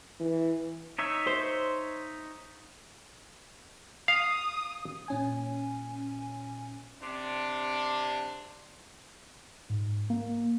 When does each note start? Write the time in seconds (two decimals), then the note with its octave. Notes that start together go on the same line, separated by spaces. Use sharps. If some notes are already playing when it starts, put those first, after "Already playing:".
0.20 E3
0.98 D#4 C#5 E5
1.27 C5
4.08 F5 D#6
5.08 A#2 C#4 G#5
7.02 C3 D4
9.70 G#2
10.10 A#3